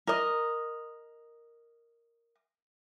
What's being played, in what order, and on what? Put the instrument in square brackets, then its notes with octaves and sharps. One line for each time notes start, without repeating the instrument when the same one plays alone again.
[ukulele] A#4 D#5